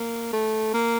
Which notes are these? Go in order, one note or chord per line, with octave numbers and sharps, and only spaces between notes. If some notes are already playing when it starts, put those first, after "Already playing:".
Already playing: A#3
A3
A#3